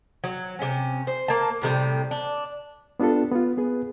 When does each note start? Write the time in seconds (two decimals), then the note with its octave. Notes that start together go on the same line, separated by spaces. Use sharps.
0.24 F#3
0.59 C3 C#4
1.07 C5
1.28 A#3 A5
1.62 A2 C3 D#3 G3
2.11 D4
3.00 B3 D4 F4 G4 A4
3.31 B3 F4
3.57 B3 G#4 B4